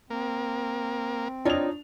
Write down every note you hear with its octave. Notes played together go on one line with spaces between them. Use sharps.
A#3 C4
D4 D#4 F4 C#5 F7